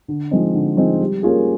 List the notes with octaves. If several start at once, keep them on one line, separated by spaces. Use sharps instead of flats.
D3
F3 G#3 C4 D#4
D3
F3 G#3 C4 D#4
G3
A#3 C#4 F4 G#4